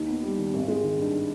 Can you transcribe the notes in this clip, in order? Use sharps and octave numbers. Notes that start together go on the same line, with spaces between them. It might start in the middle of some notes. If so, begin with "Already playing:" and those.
Already playing: D#2 D#3
B3
G3
D#3
G#1
G#3
D#3
G2